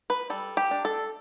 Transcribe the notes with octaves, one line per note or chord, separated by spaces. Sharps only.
B4
G3 A4
G4
D4
A4